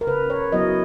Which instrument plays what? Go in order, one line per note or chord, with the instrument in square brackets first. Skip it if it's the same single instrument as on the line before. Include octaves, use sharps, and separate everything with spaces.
[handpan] A#4
C#3 B4
C#5
F#3 B3 E4 D#5